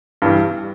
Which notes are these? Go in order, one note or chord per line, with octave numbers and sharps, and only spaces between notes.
G2 E3 G3